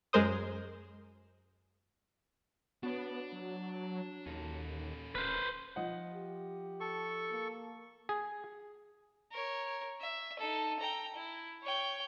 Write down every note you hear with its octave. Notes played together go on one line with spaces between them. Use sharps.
F#2 G#3 A#4 C5 D#6
B3 D4 F#4 C#5
F#3
D#2 C#4 A4
D1 B4 C5 F6 F#6
F3 D#5 F#5
G4
A4 C#6
A#3
G#4
A#4 C#5
E5
D#4 A4
G5 A#5
E4
C#5 G5